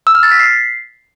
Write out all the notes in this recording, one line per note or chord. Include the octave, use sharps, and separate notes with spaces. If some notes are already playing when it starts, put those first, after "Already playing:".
E6
F6
A6
B6
C7